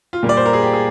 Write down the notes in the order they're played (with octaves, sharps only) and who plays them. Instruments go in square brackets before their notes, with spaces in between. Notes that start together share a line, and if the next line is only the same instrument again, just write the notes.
[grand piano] F4
A#2 G3 A#3
D5
C5
A#4
G#4
G4
G#4